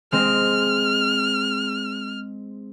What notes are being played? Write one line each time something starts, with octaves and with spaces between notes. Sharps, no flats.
G#3 C4 F6